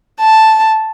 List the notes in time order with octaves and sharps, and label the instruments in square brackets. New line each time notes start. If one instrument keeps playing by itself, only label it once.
[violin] A5